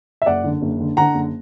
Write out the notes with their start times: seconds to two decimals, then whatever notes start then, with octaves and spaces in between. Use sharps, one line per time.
0.22 E5
0.26 F#1 D5 F#5
0.44 D3
0.62 F#1
0.80 D3
0.97 D3 F#5 A#5
1.14 F#1